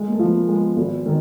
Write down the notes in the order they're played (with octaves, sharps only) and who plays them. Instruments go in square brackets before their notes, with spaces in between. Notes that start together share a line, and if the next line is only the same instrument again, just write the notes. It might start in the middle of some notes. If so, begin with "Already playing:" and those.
Already playing: [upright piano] G#3
[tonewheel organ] A#3
A3
[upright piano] F3
[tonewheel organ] B3
A#3
[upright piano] G#3
[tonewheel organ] B3
[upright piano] G#1
D#3